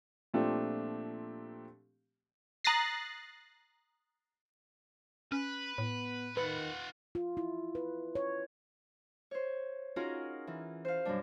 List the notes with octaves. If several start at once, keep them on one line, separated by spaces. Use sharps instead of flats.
A#2 F3 A3 C4 D4 G4
A#5 D#6 F#6 A6 A#6 C7
C#4 B4
A2 B3
D#3 F4 B4 F#5
F4
E4
B4
C#5
C5 C#5
C#4 D#4 F4 F#4 G#4 A#4
E3
C5 F5
F#2 B2 G3 D4